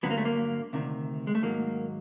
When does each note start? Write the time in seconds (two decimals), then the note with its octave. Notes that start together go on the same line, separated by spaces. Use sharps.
0.03 G2 D3 F#3 B3
0.11 A#3
0.18 A3
0.25 A#3
0.73 D2 C3 D#3
1.27 G#3
1.35 A3
1.42 G#2 D#3 F#3 A#3